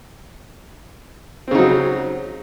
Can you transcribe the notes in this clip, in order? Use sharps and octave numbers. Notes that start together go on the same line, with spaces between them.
C#3 F#3 C4 D#4